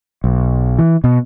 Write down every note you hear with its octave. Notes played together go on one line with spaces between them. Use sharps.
B1
E3
B2